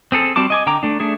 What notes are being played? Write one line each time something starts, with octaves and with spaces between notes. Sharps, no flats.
C4 G#4 A4
G3 C4 F#4 A5 D6
D#5 G#5 D6
D3 G5 A#5 D6
A3 D4
A3 D4 G#4